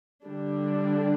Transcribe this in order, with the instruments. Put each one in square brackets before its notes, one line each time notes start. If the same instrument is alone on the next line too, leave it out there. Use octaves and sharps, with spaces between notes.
[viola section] D3 G3 D4